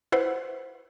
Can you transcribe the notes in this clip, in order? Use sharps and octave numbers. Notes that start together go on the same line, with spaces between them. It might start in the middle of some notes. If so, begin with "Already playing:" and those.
E4 B4 C5 F#5